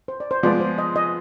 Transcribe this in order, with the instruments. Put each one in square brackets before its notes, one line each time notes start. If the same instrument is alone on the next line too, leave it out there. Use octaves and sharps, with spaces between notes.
[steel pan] C5
D5
C5
[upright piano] F3 G#3 B3 F4 [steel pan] D5
[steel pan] C5
D#5
D#5